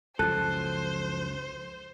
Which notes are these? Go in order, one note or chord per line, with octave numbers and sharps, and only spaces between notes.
C#2 F#2 F3 A4 C5 F#6 G6 D#7